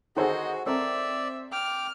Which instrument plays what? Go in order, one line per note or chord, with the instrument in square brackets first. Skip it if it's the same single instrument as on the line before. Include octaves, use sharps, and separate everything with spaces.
[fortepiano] D#3 D#4 A4 [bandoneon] F#4 [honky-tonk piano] G#4 C5 F#5 [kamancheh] D#5
[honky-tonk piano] C4 [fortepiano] A4 A#4 [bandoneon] D5 [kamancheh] E5
[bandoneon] G5 D6 [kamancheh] F6